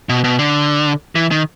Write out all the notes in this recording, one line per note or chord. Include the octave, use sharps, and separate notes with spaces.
B2
B2
D3
E3
D#3